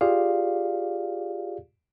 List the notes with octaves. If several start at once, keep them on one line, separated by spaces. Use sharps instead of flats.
F4 G4 G#4 D5 F5